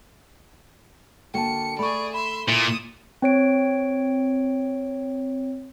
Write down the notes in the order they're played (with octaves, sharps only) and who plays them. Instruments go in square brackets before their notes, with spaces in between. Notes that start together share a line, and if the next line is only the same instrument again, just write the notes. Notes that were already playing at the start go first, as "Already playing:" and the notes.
[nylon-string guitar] D3 A#3 F#4 [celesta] G5 A5 [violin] C#7
[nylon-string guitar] A3 [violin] G#4 D5 [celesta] B5 C#6
[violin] E5 C6 [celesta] B5
[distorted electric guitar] A#2 [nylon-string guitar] E4 [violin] D#6 E6 [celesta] C#7
[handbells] C4 C#5 D7